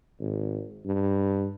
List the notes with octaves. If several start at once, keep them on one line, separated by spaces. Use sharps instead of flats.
G#1
G2